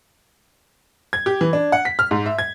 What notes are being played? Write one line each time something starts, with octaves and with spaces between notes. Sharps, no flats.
G#6
G4
E3
D4
F#5
B6
F6
G#2
E5
G#6